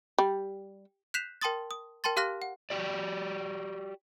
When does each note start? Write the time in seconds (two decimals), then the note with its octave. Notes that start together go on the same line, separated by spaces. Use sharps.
0.18 G3
1.14 F#6 G6 B6 C7 E7 F7
1.41 A#4 G5 A5 C6 D#6 A6
1.71 D#6
2.04 A#4 G5 A5 C6 A6
2.17 G4 F5 C6 F6 F#6 A#6
2.42 F#5
2.70 F#4 G4 D5